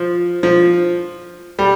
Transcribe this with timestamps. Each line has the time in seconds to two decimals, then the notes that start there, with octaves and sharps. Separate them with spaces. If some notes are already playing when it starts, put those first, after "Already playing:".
Already playing: F3
0.43 F3
1.59 G3